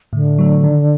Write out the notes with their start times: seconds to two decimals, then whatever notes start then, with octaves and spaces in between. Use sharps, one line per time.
0.13 A2 D3
0.38 F#3 A3
0.64 D#3